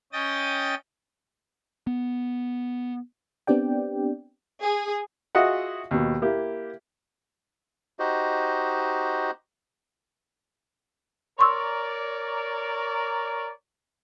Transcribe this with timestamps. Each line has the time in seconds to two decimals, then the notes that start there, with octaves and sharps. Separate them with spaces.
0.13 C#4 D#5 G5 D#6 A6
1.87 B3
3.47 B3 C4 D4 G4 D5 G5
4.63 G#4
5.35 F4 F#4 G#4 D#5 E5 F#5
5.91 D#2 B2
6.22 A#3 E4 G4
7.99 D#4 F#4 G4 C5 D#5
11.39 A#4 C#5 D5 C6 C#6 E6